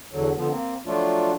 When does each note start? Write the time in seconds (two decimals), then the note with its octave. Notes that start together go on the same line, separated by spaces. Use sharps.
0.12 E2 D3 F#3
0.36 D3 F3 B3
0.50 A#3 C4
0.86 F3 F#3 A3 D4 F4